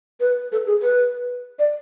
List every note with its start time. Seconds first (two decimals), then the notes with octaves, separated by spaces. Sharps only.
0.20 B4
0.52 A4
0.67 G#4
0.82 B4
1.59 D5